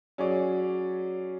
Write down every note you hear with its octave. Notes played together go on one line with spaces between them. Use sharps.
F#3 C#4 G#4 D5